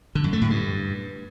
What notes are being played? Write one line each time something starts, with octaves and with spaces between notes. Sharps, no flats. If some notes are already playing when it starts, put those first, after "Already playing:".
D3
F#2
A3
A2
G2